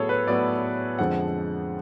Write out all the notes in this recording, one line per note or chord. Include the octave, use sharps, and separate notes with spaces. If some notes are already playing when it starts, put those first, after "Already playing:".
Already playing: A2 F#3 B3 G#4 A4 C#5
B4
A2 F#3 B3 D5
F2 D3 F3 G#3 F#5